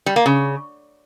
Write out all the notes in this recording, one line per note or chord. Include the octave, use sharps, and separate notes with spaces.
G3
A#3
C#3